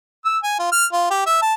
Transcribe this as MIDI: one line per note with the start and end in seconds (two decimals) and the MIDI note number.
0.25 0.37 88
0.43 0.54 80
0.59 0.70 65
0.72 0.85 89
0.93 1.05 65
1.11 1.22 67
1.27 1.40 76
1.42 1.54 81